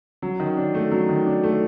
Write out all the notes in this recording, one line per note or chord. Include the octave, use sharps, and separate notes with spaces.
F#3
D#3
D4
A3
F#3
D#3
D4
A3